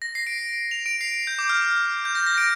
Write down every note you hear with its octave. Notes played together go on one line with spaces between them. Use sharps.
A#6
C7
D7
F7
D7
C7
G6
D6
F6
G6
A#6
A#6
D7